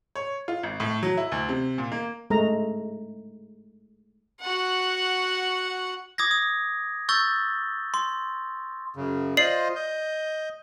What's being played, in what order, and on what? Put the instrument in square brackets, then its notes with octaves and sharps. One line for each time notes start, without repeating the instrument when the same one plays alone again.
[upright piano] C#5
F4
G#1
A2
F#3
E4
D2
C3
A#2
A#3
[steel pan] G#3 A3 A#5
[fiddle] F#4 F#5
[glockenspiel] D6 D#6 G#6 A#6
D#6
C#6 E6 G6 A6 G7
C6
[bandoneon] F#2 C#3
[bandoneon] F4 C5 D#5 [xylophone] D5 C7 F#7
[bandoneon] D#5 G6